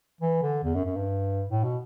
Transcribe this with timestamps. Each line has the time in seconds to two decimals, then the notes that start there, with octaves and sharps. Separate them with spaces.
0.21 E3
0.42 D3
0.64 E2
0.75 F#2
0.85 F#2
0.96 G2
1.49 A2
1.64 B2